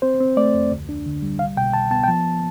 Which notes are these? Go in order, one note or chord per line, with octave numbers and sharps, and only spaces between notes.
C4 C5
C4
A3 D5
F2
D2
D4
D3
G3
C2 F5
B2 G5
C2 A5
B3 A5
G5
F3 A5